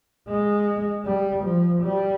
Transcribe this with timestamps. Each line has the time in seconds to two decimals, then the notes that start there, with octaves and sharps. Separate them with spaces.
0.28 G#3
1.06 G3
1.44 F3
1.83 G3